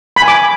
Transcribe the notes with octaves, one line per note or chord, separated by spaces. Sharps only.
B5
G#5
D6